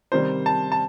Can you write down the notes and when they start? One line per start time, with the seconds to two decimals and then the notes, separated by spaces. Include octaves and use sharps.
0.12 C3 D#3 G3 C5
0.46 A5
0.72 A5